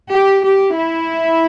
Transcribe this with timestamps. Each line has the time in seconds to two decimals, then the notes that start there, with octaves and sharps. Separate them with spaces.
0.11 G4
0.44 G4
0.77 E4